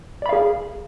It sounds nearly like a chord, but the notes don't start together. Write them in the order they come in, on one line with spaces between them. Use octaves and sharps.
D5 B5 F5 G#4